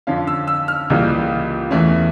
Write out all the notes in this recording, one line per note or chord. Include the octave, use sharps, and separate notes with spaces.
F2 D3 F3 C#4 F5
E6
E6
F6
C#2 C#3 E3 G3 A#3
E2 E3 A3 C#4